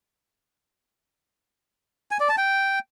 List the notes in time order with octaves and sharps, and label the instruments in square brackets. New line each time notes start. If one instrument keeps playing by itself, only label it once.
[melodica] G#5
D5
A5
G5